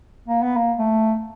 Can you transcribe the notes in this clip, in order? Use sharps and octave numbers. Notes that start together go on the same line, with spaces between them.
A#3
B3
A#3
A3